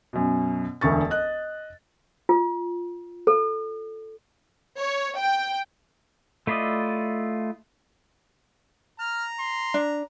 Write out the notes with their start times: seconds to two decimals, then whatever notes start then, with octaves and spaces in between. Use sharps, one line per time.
0.13 F#2 B2
0.81 E1 D2 C#6 A6
1.11 D#5 F#6
2.29 F4
3.27 A4
4.79 C#5
5.19 G5
6.47 A3 E4 F4 D5 D#5
9.00 A#5 F6
9.39 C6
9.74 D4